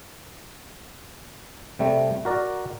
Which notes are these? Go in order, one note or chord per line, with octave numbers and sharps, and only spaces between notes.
C3 G3 A3
F#4 A#4 D5